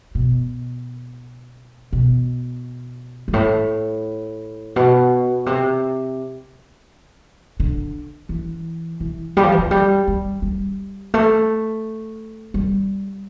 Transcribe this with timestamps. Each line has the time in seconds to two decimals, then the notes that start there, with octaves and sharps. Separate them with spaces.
0.15 B2
1.93 B2
3.28 G2
3.33 A2
4.76 B2
5.46 C3
7.60 D3
8.29 E3
9.00 E3
9.37 G3
9.43 F3
9.52 E3
9.59 F3
9.71 G3
10.07 G3
10.42 G3
11.14 A3
12.54 G3